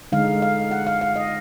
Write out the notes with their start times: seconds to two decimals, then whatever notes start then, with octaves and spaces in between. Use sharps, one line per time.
0.12 D3 G#3 D#4 F5
0.42 F5
0.71 F#5
0.87 F5
1.01 F5
1.16 D#5